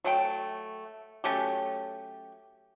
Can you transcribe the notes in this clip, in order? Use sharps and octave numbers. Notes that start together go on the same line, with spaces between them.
F#3 A3 G5
F#3 A3 C#4 G4